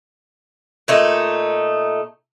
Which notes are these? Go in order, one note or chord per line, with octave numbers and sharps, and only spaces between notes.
A#2 A3 D#4